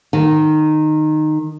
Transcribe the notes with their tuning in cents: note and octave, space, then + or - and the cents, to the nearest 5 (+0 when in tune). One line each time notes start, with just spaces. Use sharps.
D#3 -15